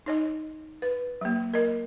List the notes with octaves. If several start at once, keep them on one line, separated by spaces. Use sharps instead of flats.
D#4 C#5 D#5
B4
F#3 A#3
A#4 D#5